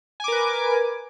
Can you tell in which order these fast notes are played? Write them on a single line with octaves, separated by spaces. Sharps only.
G#5 D6 A#4 B4